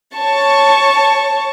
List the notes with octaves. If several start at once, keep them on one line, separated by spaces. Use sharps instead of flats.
C#5 A5 C#6